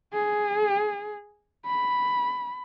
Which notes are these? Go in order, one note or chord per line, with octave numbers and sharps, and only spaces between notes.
G#4
B5